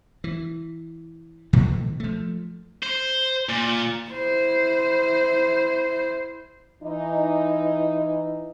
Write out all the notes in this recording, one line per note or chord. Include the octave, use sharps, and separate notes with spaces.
E3
B2 D#3 F3 A3
F3 A3
C5
A#2
E4 C5
E3 D#4